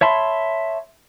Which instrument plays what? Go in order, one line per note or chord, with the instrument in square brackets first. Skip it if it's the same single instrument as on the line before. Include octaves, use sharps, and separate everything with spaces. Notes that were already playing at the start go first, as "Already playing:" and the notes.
[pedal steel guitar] C#5 E5 A5 B5 C6